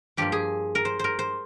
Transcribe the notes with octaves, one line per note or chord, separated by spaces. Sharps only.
G2 F3 A#3 G4
G#4
A#4
C5
A#4 C5
C5